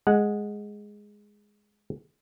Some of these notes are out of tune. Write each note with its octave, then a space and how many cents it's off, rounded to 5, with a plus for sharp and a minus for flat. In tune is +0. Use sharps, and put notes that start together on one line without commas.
G#3 +0 F#5 -10